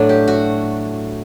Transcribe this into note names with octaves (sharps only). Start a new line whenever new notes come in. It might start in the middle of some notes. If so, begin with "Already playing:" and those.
Already playing: A2 F#3 A3 D4
G4
F#4